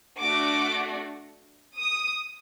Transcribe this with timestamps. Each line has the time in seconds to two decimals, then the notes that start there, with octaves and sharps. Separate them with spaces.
0.19 A3 D4 F#4 D6
1.76 D#6